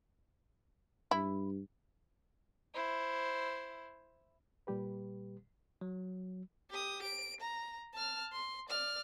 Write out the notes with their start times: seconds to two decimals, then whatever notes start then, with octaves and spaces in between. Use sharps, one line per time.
1.11 G2 E4
2.74 E4 C5
4.67 A#2 G3 G4 B4
5.81 F#3
6.70 G4 D#6
7.03 D7
7.40 A#5
7.94 A5 F6
8.32 C6
8.69 D5 F6